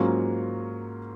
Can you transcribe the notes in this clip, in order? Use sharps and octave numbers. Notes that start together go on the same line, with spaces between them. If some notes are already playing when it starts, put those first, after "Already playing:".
Already playing: G#2 F#3 A#3 C#4 F4